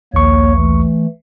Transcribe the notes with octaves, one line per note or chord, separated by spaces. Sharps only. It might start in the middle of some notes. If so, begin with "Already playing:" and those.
A#1 D#2 A#3 C#5 C#6
E3 A3